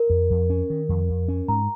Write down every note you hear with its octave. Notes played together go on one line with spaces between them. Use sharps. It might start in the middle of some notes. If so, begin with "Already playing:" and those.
Already playing: A#4
F2
F2
C#4
D#3
F2
F2
C#4
G#2 A#5